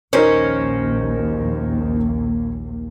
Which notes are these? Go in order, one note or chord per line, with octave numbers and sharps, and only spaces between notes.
A#1 D#2 A#3 C#4 D#4 A#4 C5